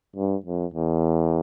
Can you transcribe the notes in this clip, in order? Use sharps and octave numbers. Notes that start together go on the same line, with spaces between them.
G2
F2
E2